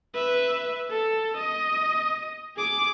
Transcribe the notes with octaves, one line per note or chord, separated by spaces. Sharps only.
B4 E5
A4
D#5
G#4 D6